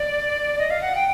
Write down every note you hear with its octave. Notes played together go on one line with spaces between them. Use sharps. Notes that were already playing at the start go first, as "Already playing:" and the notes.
Already playing: D5
D#5
F5
F#5
G5